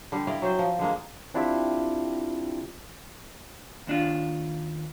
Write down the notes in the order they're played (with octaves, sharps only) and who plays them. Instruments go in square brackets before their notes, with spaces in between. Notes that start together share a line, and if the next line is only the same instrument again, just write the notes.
[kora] D3 G3
E4 D5 D#5 F5
F#3 C4 C5
F3
D3 G#3 A#3
[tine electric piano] C4 D4 E4 F4 G4 E5
[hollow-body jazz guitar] D#2 D4 F4